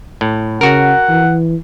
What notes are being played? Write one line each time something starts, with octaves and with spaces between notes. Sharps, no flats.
A2
C#3 F#4 A#4 F#5
E3